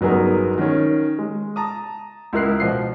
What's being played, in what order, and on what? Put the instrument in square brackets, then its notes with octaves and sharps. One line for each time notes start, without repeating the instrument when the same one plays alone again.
[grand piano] G1 F#3 B3 D#4 G#4 A#4
D#3 C#4
G#3
A5 A#5 D#6
C#2 E4 A#4 F#6 C7
B2 F3 D#5 C7